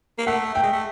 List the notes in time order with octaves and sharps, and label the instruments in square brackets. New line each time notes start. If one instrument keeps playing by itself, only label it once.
[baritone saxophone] A#3
[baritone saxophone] A3 [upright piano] F#5
[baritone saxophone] A3 [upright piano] G5
[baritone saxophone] G#3
A3